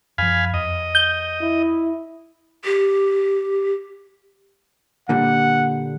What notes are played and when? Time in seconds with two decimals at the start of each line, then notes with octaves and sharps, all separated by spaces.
0.18 F#2 F3 F5 G#5 B5
0.54 F2 D#5
0.95 G6
1.41 E4
2.64 G4
5.09 A#2 D3 G3 F#5